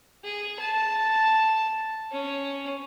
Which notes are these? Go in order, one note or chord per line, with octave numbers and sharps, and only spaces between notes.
G#4
A5
C#4